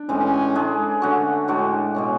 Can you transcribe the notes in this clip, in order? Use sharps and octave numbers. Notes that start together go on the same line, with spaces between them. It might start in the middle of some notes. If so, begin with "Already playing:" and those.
Already playing: D4
A2 E3 G#3 C#4
G#3 D4 G#4
D3 A3 C#4 F#4
A2 G#3 D4 F#4
B2 G#3 C#4